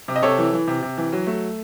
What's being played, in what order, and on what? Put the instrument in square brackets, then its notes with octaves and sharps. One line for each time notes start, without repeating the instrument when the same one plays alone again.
[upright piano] C3
D#5
C3 A4 C#5
E3
E3
C3
C3
E3
F#3
A3